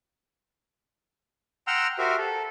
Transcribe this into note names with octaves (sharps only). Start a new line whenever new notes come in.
F#5 G5 A#5 C6 E6 F6
F#4 G4 A#4 C5 E5
A4